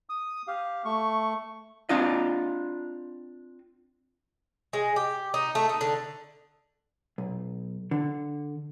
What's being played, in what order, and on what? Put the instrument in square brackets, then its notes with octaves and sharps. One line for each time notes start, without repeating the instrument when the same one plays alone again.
[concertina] D#6
G4 F5
A3 C#6
[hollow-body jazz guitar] C4 D4 F4 D#5
[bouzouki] G#3
G4
D#4
A3
D#4
D3
[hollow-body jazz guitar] B1
D3